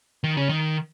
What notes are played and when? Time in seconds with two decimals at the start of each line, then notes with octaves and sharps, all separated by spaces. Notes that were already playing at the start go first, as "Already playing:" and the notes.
0.24 D#3
0.37 C#3
0.49 D#3